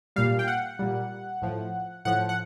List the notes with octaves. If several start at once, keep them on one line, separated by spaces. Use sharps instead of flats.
A#2 G3 F5
G5
F#5
A#2 G3
A2 F3
A2 F3 F#5
F#5